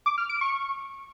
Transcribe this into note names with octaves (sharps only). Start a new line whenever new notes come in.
D6
F6
D7
C#6